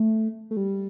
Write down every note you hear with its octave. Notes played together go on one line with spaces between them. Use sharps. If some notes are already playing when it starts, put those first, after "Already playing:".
Already playing: A3
A3
G3